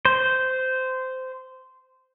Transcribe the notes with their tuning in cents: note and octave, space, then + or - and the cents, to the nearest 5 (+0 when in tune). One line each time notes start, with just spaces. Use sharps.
C5 -15